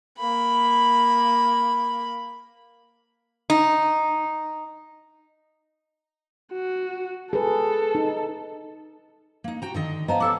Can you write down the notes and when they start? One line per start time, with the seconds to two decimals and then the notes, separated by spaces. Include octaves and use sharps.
0.18 A#3 B5
3.50 D#4
6.53 F#4
7.33 G#4 A4 B4
7.95 D#4
9.44 A#3 D#4
9.62 F#4 G5 A#5
9.74 D3 D#3 D#5
10.08 B3 C5 D#5 F5 A5 A#5
10.20 B3 A4 C#5 D6 E6